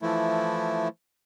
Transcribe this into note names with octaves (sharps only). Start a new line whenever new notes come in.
E3 F3 A3 E4